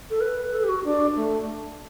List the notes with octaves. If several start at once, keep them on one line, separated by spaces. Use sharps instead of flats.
A4
B4
A4
G4
F#4
D4
A3